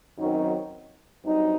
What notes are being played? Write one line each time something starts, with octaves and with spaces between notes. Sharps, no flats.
F#2 D#3 F#3 C4 D#4
G2 F#3 C4 D#4